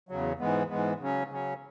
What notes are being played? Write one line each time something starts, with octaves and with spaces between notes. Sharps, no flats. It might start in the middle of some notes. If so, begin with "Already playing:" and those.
E2 C#3 F#3
G#2 E3 G#3 B3
G#2 E3 G#3 B3
C#3 F#3 C#4
C#3 F#3 C#4